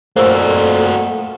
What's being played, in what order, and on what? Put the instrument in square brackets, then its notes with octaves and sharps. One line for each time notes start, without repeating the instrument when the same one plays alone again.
[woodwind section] F2 A#2 [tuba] A3 [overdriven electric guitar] A#3 F#4 [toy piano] A#4 C5